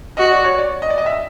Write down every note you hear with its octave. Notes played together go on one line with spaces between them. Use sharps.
F#4 D#5
D5
C#5
D5
D#5
D5
D#5
E5